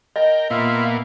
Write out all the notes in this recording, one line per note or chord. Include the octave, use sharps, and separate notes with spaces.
A#4 D#5 G5
A#2 A#3 B3 F4 E5